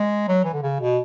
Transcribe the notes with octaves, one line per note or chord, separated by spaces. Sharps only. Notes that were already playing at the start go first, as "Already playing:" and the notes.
Already playing: G#3
F#3
E3
D3
C#3
B2